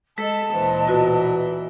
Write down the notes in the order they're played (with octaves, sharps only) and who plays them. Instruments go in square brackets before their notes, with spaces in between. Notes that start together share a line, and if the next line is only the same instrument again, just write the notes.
[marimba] G#3 [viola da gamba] A4 [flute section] D#5 A5
[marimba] D2 [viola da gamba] A#2 E3 [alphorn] C5
[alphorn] B2 [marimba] F4 F#4 B4